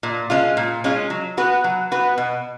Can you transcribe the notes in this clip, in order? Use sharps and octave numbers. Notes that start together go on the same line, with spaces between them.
A#2
G#3 C#4 F4
A#2
G#3 C#4 F4
F#3
B3 F#4 B4
F#3
B3 F#4 B4
B2